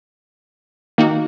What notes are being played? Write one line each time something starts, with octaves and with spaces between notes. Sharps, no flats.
D#3 A#3 D#4 F#4